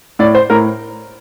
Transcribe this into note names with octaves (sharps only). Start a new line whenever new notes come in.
A2 D5
C5
A2 A#4